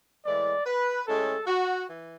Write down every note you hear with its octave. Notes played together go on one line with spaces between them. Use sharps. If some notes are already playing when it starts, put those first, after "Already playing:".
A2 E3 G#3 D5
B4
A2 G#3 C#4 A4
F#4
E3